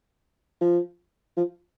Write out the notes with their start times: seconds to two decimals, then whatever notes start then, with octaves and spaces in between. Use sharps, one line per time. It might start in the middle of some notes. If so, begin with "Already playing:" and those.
0.61 F3
1.37 F3